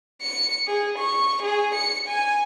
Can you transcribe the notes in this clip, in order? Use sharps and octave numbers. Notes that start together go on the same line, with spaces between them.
C#7
G#4
C#6
G#4
C#7
G#5